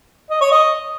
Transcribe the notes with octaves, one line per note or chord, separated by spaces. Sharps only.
D#5
C#5
D#5